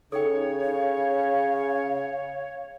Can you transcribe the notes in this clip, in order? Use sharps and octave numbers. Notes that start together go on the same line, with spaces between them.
C#3 D#4 A4 C#5 G5
F5